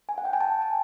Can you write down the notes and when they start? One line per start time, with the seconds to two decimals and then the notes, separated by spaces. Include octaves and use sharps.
0.09 G#5
0.18 F#5
0.25 G5
0.33 G#5
0.41 A5
0.62 A5